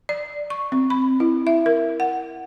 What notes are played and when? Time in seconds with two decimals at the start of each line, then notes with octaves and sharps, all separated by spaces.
0.09 D5
0.50 C#6
0.72 C4
0.90 B5
1.20 E4
1.47 E5
1.66 A#4
2.00 F#5